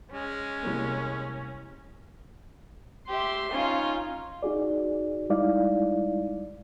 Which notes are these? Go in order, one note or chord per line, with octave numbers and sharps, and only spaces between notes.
G#3 C#4
C2 A#3
G4 E5 C6
C#4 D#4 F4
D#4 F#4 G#4 D5
G3 G#3 D#4 E4 D5 F5